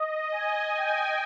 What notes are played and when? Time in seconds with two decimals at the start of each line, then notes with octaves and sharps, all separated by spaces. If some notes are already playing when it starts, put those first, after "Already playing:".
Already playing: D#5
0.31 G#5
0.74 G5